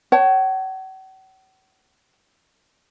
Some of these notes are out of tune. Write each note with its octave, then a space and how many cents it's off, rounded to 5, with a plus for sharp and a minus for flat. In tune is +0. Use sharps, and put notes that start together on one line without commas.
C#5 +0 F#5 +45 A5 +0